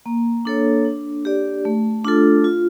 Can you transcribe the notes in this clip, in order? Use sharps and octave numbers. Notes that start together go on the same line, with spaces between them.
A#3
D4 A4 C#5
D4
G4 D5
A3
D4 F4 A4
F4